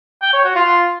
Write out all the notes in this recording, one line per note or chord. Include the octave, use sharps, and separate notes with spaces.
G5
C#5
F#4
F4